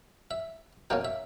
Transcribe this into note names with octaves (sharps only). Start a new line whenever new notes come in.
E5
B2 A#3 C#4 G5
E5